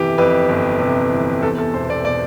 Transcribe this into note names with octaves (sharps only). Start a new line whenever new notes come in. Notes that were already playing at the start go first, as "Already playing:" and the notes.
Already playing: G1 F2 C3 E3 G4 B4
F2 B4
G1
C3
E3
E2 A4
A4
E1 C5
D5
B2 D5